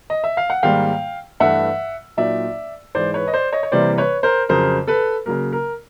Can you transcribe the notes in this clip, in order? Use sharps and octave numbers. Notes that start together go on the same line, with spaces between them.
D#5
E5
F5
F#5
G#2 D#3 G3 A#3 F5 G5
G2 E3 A3 D4 E5 F#5
A#2 F#3 A#3 D#4 D5 E5
G#2 E3 G#3 C5 D5
B4 C#5
D#5
C5 D5
C#5 D#5
C#5
C3 E3 G3 A#3 C5 D5
B4 C#5
A#4 C5
F2 C#3 F#3 A#4 C5
A4 B4
C#3 F#3 A#3 A#4
A#4